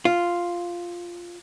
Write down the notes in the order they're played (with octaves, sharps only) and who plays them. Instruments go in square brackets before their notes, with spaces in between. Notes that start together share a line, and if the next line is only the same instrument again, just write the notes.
[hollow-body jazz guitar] F4